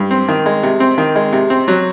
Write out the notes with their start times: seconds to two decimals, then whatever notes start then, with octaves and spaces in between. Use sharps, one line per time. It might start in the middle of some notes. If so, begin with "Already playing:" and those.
Already playing: G2
0.11 C4
0.28 D#3
0.46 G#3
0.63 C3
0.80 C4
0.98 D#3
1.16 G#3
1.33 C3
1.50 C4
1.68 F#3